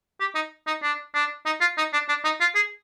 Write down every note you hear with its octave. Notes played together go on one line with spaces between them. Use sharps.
G4
D#4
D#4
D4
D4
D#4
F4
D#4
D4
D4
D#4
F4
G#4